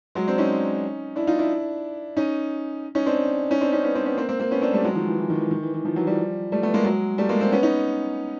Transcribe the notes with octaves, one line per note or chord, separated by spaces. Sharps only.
F#3 G#3
C4 D4
C#4 D#4
D4 E4
D#4 F4
D4 E4
C#4 D#4
C#4 D#4
C4 D4
C#4 D#4
C4 D4
C#4 D#4
B3 C#4
C4 D4
B3 C#4
A#3 C4
A#3 C4
A#3 C4
B3 C#4
C4 D4
G3 A3
F#3 G#3
D#3 F3
E3
E3
D#3
E3
D#3
E3
E3
D#3 F3
E3 F#3
F3 G3
G3 A3
A3 B3
G#3 A#3
F#3 G#3
G3 A3
G#3 A#3
A#3 C4
B3 C#4
C#4 D#4